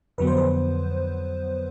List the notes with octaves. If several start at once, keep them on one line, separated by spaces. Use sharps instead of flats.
F2 D3 F#3 B3 B4
C5
B4